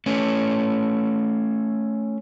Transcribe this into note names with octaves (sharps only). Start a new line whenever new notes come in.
A3 C#4